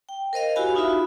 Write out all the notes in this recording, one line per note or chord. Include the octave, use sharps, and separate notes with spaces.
G5
A#4 C5 D#5 F5
E4 F#4 G4 F5 G#5 B5
D#4 F4 F#4 E5 B5